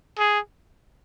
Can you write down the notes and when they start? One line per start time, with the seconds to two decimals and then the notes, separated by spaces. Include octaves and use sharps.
0.19 G#4